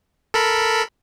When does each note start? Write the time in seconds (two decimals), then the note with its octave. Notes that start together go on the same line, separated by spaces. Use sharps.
0.34 A4 A#4 B5